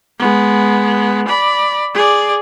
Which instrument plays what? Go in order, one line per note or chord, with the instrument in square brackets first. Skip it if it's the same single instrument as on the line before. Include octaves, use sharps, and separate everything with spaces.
[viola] G#3 B3
D5 B5
G#4 D5